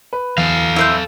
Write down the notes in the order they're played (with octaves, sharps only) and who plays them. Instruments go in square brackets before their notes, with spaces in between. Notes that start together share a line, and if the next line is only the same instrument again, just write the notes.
[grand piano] B4
[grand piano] E2 [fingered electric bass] E3 [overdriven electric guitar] A4 F5
[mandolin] E4 C5 G6